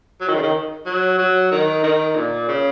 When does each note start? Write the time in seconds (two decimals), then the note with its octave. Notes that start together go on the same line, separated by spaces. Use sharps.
0.21 F#3
0.28 D#3
0.35 C#3
0.43 D#3
0.86 F#3
1.18 F#3
1.51 D#3
1.84 D#3
2.16 A#2
2.48 C#3